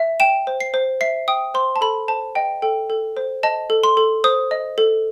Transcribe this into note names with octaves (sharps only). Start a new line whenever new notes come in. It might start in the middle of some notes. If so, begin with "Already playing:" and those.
Already playing: E5
G5 E7
C5
C7
C5
E5 C7
G5 D#6
C5 C6
A5
A4 B5
C5 A5
D#5 G5
A4 G5
A4
C5
D#5 A5
A4
C6
A4
C5 D#6
D#5
A4